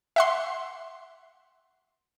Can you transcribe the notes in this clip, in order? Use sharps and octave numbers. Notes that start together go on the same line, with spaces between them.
E5 F#5 C6